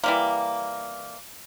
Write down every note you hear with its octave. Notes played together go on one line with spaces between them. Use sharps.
E3 G3 A#3